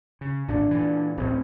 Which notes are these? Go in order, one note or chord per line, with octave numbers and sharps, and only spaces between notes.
C#3
G#1 A#2 D3 D4
A#2 E3
D1 A1 A2 C4